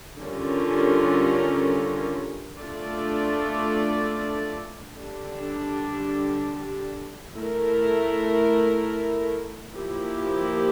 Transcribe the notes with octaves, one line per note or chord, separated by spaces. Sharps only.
D3 G3 C#4 F4 A#4
A3 D4 F4 A4 D5
D3 G3 D4 G4
A3 E4 A#4
F3 A#3 E4 G4 A#4